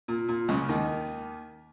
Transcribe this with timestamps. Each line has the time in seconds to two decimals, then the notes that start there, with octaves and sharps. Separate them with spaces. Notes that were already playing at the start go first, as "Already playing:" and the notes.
0.08 A#2
0.29 A#2
0.49 C#2 C#3
0.69 D#2 D#3